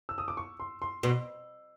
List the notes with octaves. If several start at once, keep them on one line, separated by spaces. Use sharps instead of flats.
E6
D#6
D6
C#6
C6
C6
B2 C6